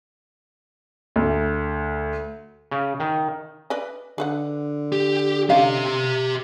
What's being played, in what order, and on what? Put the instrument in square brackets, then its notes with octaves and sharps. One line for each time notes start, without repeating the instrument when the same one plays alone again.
[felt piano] D2
[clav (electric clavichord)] C#3
D#3
[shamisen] B4 D5 D#5
[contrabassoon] D3 [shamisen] G#4 B4 F#5
[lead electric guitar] G4
[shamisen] C#4 D#4 F5 [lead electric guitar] G4 E5